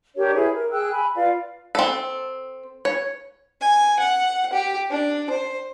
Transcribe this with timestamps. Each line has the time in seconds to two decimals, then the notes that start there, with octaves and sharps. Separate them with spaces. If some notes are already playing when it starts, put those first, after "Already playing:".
0.16 D4 G4 A#4 C#5
0.34 E4 G#4 B4
0.54 A#4
0.71 G#4 G5 E6 F#6
0.92 G#5 B5
1.15 F4 B4 D5 F5
1.75 C4 A4
2.85 C#5
3.61 G#5
4.00 F#5
4.53 G4
4.91 D4
5.30 C5